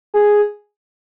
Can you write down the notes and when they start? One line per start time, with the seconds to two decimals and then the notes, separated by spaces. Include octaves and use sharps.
0.14 G#4